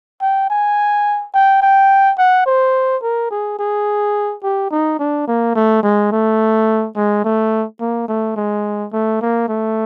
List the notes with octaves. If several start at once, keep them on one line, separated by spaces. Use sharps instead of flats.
G5
G#5
G5
G5
F#5
C5
A#4
G#4
G#4
G4
D#4
D4
A#3
A3
G#3
A3
G#3
A3
A#3
A3
G#3
A3
A#3
A3